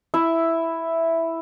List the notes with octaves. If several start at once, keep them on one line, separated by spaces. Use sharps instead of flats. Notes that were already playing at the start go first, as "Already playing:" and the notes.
E4 E5